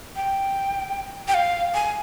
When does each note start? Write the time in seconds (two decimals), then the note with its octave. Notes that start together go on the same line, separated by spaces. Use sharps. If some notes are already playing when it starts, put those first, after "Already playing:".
0.16 G5
1.28 G5
1.34 F5
1.74 G#5